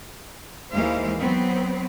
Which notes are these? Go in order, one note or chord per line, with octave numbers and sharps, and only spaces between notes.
D#2 E3 G#3 A#4 C5 F5
F#3 B3 C4